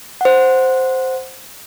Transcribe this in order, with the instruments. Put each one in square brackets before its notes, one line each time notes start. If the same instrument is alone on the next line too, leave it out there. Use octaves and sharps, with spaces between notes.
[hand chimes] C5 F#5